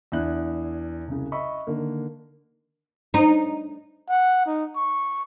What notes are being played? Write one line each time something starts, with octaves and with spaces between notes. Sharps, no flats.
E2 D4 E4 F#6
C2 C#3
D#5 E5 B5 C#6 E6
D3 D#3 A#3
D#4
F#5
D#4
C#6